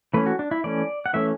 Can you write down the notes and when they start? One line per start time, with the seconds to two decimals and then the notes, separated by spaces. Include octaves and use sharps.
0.14 E3 A3 C#4 B4
0.26 F#4
0.39 D4
0.51 E4
0.64 E3 A3 C#4 D5
1.06 F#5
1.13 E3 A3 C#4 E5